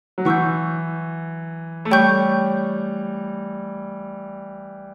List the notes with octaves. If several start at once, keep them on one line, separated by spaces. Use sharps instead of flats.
F#3
E3 F#5 C#6 E6 G6
A3
G3 C#5 G5 C#6 G6